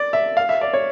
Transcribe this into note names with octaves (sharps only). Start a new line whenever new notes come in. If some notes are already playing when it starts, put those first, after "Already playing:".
Already playing: D5
E5
F5
E5
D5
C#5